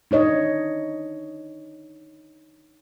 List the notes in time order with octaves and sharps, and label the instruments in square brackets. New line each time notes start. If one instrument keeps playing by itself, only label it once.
[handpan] D4 D#4 C#5 D#5